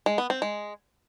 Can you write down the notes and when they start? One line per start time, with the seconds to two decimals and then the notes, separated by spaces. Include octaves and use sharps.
0.06 G#3
0.18 B3
0.30 C4
0.42 G#3